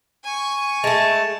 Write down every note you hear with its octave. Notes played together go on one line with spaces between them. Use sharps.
G#5 C#6
G#3 A3 A5